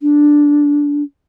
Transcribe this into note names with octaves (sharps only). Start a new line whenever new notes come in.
D4